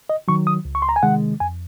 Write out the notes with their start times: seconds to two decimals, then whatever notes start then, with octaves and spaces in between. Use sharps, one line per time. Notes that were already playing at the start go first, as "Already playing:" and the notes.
0.10 D#5
0.28 D#3 F#3 C#6
0.47 D#6
0.65 C#2
0.75 C#6
0.82 C6
0.89 A#5
0.96 G#5
1.03 C3 D#3 G#3 F#5
1.40 F2 G#5